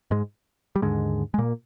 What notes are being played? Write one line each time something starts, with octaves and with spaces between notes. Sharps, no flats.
G#2 G#3
G3
D#2 G#2 D3 G#3
G#3
A#2 A#3